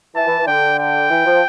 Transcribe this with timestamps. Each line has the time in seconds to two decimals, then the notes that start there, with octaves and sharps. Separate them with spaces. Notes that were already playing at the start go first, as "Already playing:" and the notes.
0.15 E3 A5
0.27 E3
0.40 E3
0.47 D3 G5
0.79 G5
1.10 E3
1.26 F3